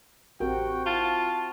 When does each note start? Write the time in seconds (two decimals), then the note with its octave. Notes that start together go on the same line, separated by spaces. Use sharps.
0.40 A1 C4 F#4 G4 A#4 G5
0.86 E4 F4 A5